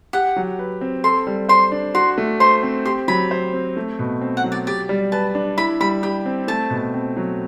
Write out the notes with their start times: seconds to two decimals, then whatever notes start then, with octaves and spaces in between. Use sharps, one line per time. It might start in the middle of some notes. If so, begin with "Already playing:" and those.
0.13 G4 F#5
0.36 F#3
0.59 B4
0.81 C4
1.04 A4 C6
1.27 G3
1.49 C5 C6
1.72 D4
1.94 F#4 C6
2.18 A3
2.40 C5 C6
2.63 C4
2.85 G4 C6
3.08 F#3 B5
3.31 C5
3.53 C4
3.77 A3
3.99 B2
4.21 C4
4.37 F#5
4.44 F#3
4.52 D5
4.67 G4 D5
4.89 G3
5.12 B4 A5
5.35 D4
5.57 E4 B5
5.80 G3 B5
6.03 G4 B5
6.25 C4
6.48 A3 A5
6.70 B2
6.94 C4
7.17 F#3